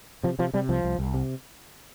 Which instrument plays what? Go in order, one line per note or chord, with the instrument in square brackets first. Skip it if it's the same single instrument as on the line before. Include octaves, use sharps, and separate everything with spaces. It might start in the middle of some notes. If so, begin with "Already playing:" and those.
[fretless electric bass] C3 F3
C3 F3
C3 G3
C2 F3
C2
C2
C3